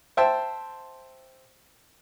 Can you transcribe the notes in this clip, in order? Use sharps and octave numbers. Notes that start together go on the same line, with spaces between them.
C5 E5 G5 A5